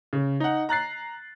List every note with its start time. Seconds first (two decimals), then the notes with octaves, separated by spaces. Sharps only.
0.13 C#3
0.40 D#4 F#5
0.69 A#5 F#6 A6 C7